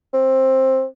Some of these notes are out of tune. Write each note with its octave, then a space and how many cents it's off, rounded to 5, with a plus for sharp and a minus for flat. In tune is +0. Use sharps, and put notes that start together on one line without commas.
C4 +15